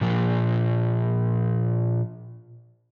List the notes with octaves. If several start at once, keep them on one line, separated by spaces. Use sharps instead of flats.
A#2 F3